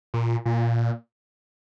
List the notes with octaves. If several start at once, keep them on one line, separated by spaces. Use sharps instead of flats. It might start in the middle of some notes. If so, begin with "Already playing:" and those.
A#2
A#2